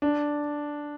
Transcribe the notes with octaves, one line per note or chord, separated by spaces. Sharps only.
D4